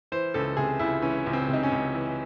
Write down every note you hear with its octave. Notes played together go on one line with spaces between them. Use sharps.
E3 C5
C#2 A4
C3 G#4
C#2 E4
E3 C#4
C#2
C4
C3
D#4
C#4
C#2
E3